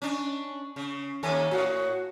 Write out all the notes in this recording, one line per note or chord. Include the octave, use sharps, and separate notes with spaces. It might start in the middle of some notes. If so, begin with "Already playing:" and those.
C#4 D4
C#3
D#2 A#3 A4 C#5 G#5
A2 F#4